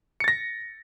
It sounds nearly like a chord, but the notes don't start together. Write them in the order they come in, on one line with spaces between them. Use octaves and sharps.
C#7 A6 A#6